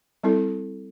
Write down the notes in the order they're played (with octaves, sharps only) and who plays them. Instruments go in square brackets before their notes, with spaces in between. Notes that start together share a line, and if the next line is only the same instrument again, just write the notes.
[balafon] G3 C4 E4 A4